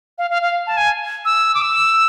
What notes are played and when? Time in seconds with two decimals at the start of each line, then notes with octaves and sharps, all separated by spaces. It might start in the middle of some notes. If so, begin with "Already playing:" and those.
0.18 F5
0.31 F5
0.42 F5
0.67 A5
0.77 G#5
1.25 E6
1.55 D6
1.62 E6